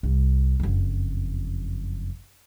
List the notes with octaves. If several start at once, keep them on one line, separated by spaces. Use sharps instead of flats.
C2
F#1 F2